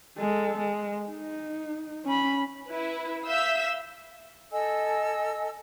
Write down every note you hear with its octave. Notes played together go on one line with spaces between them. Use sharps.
G#3 A4
G#3
D#4
C#4 B5
E4 B4
E5 F5 E6 G6 B6
A4 D#5 G#5 E6